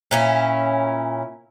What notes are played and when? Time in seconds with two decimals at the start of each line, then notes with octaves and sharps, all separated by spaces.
0.11 A#2 C#4 E4